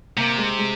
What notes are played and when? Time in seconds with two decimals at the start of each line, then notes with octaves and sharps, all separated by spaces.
0.17 C3 A#3
0.38 G#3
0.59 G#3